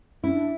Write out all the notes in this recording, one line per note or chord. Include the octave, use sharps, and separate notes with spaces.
C#4 E4
D4